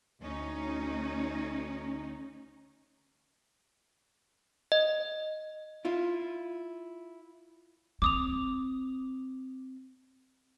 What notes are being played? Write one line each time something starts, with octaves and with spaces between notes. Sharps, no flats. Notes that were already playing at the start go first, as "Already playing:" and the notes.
D2 C#4 D#4
D#5
E4 F4
C4 D6 D#6 F7